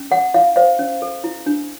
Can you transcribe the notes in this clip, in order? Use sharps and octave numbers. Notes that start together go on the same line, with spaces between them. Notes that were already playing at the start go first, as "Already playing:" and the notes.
Already playing: C#4
A4 F#5
E4 F5
C5 F5
C#4
A4
E4
D4